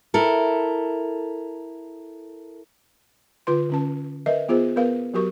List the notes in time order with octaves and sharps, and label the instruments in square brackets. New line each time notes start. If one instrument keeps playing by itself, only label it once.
[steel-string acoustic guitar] E4 A4 A#4
[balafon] D3 F4 B4 C6
D3 C#4 A5
A#4 B4 D#5 E5
B3 F4 G#4 C5
B3 A#4 B4 F5
F#3 F#4 G4 A#4 C#6